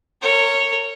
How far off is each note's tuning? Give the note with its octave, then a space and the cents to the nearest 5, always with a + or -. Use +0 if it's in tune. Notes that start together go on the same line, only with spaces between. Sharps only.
A#4 -30 C#5 +0